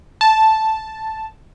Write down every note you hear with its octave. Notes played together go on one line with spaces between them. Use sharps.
A5